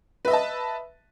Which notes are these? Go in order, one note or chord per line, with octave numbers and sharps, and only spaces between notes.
B4 D#5 E5 A5